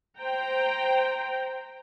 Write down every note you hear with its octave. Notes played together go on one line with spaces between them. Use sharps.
C5 G5 A#5